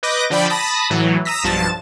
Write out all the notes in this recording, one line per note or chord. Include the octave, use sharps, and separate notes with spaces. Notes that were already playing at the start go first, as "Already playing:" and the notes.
B4 D#5 D6 G6 A#6
D3 F3 D5 G5 B5
A5 B5 D#6 A#6
A2 E3 F#3
A#5 D#6 E6 A#6 B6
B1 G2 F3 A5 A6 E7